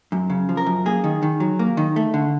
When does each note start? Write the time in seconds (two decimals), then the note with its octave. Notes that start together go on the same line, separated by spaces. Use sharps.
0.12 F#2
0.30 C#3
0.49 F3
0.57 A#4
0.66 F#2
0.86 A#3 G#4
1.04 D#3
1.23 D#3
1.40 F#3
1.59 A#3
1.77 D#3
1.96 A3
2.14 D3